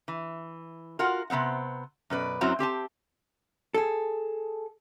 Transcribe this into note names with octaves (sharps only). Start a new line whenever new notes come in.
E3
F4 F#4 A#4 F#5
C3 B3 C4 F#5
F#2 B2 B4 D5
F#2 F#3 C4 E4 F#4 A#5
C4 G4 G#5 A5
G#4 A4